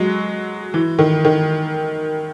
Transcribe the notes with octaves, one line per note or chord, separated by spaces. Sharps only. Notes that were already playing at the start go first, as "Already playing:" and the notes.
Already playing: F#3 G#3
E3
D#3
D#3